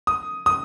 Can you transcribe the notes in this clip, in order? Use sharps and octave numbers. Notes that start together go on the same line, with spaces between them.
D#6
D#6